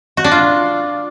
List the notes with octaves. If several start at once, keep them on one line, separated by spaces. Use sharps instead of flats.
F#4
D4
F4